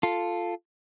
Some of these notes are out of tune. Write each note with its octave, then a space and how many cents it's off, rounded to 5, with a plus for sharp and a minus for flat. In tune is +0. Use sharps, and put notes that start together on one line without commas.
F4 +0 A4 +0